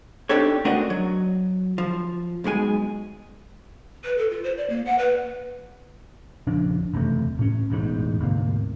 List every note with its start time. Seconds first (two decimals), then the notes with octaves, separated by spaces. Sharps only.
0.29 C4 D4 D#4 G4 A4 C#5
0.65 A3 C4 D4 F#4 A#4 D#5
0.90 F#3
1.78 F3
2.44 B1 B2 G#3 G#5
4.04 B4
4.18 A4
4.30 F4
4.44 C5
4.57 D5
4.70 A#3
4.86 F#5
4.99 B4
6.47 A#1 F2 C#3 D4
6.94 F#1 E2 C3 A3
7.39 A2 C#4
7.70 E1 A1 E2 G#2
8.20 D2 G#2 C3 A#3